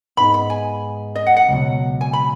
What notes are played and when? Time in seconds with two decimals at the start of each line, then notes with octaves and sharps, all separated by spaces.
0.17 G#2 G#3 B3 D#4 B5
0.34 B5
0.50 G#5
1.15 D#5
1.26 F#5
1.37 F#5
1.49 C#2 B2 F#3
2.01 G#5
2.13 B5